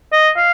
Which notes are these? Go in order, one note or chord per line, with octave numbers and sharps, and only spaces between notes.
D#5
F5